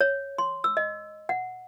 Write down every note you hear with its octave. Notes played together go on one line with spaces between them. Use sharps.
C#5
C6
E6
D#5
F#5